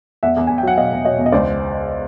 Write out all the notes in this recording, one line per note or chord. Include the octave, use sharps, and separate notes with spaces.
E2 E5 F#5
E2
E2 G#5
G5
F#3 F#5
B2 D#5 F5
E2
B2 C#5 D#5
E2
D#5
C#2 C5 D5